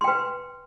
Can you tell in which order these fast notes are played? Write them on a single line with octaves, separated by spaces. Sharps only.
C6 G5 B4